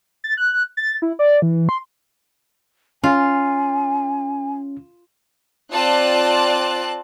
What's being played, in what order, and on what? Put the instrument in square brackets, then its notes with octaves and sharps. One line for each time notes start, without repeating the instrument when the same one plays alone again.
[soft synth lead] A6
F#6
A6
E4
D5
E3
C6
[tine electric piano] C#4 [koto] F4 [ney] G#5
[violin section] C4 F4 D5 A5 F#6